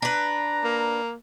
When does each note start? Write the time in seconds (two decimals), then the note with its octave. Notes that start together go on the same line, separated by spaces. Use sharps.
0.02 D4 B4 A#5
0.64 A#3